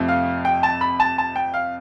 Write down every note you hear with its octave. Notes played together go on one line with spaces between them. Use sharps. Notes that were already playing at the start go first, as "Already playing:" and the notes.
Already playing: F2 C3 F3 A3
F5
G5
A5
B5
A5
A5
G5
F5